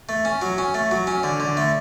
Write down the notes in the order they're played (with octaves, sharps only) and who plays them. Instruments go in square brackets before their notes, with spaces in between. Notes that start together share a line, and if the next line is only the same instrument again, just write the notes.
[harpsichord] A3
C#4
F#3
C#4
A3
F#3
C#4
D3
D3
A3